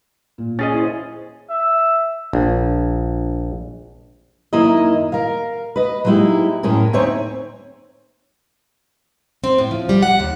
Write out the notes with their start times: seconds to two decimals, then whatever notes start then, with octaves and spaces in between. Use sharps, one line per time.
0.38 A#2
0.59 C#4 G#4 D#5 A6
0.73 E4 C5
1.50 E5
2.33 A#1
4.53 F#2 D#3 A#3 E4 A#4 D#5
5.12 A#4 F5
5.76 B4 D#5
6.05 F#3 G#3 A#3 D#4 E4 G4
6.63 F#2 A2 C#4 G#4 A#4
6.93 D2 C4 D#4 C#5 E5 G#5
9.44 C4
9.58 A2
9.71 F3
9.89 G3
10.03 F#5
10.20 D#2